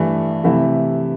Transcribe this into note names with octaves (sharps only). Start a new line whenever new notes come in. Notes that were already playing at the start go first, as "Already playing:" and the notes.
Already playing: G2 E3 A3 D4
C3 E3 A3 E4